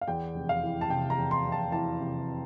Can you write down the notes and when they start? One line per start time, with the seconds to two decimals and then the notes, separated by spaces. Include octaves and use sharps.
0.01 F5
0.08 E2 G5
0.35 F1
0.49 F5
0.63 E3
0.81 A5
0.90 C3 G5
1.10 A#5
1.18 E2
1.31 C6
1.45 F1
1.52 A5
1.72 E3 A5
2.00 C3